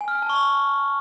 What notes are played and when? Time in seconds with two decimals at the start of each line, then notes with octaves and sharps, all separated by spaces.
0.01 G#5
0.08 F6
0.15 G#5
0.22 A5
0.29 C#6